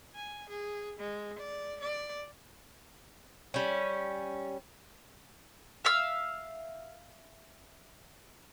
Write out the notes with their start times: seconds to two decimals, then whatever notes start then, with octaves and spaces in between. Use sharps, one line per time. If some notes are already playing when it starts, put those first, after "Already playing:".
0.15 G#5
0.49 G#4
0.99 G#3
1.39 D5
1.81 D5
3.54 G3 C#4
5.85 E5 F5 E6